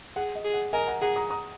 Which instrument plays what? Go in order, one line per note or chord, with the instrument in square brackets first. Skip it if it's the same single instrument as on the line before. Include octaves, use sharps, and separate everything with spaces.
[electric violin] G#4 [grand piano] F#5
[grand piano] D#5
[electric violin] G#4
[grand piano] F#5
[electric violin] A#4 [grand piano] D#5 G#5
[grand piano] F#5 A#5
[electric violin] G#4 [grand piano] F#5 A#5
[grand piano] A#5 D#6
A#5 D#6